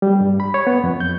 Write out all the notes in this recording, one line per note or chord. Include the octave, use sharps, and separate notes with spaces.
G3
G2
B5
C#5
B3
F2
G6